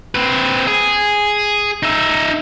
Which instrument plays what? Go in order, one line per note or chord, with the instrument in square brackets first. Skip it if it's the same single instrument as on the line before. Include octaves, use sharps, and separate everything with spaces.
[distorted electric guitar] C4 B4
G#4
D#4 E5